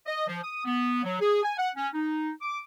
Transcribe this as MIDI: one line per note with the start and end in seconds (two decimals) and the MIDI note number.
0.06 0.26 75
0.27 0.39 53
0.43 0.61 87
0.65 1.03 59
1.03 1.18 54
1.20 1.42 68
1.43 1.53 80
1.58 1.70 78
1.75 1.88 61
1.93 2.30 63
2.41 2.60 86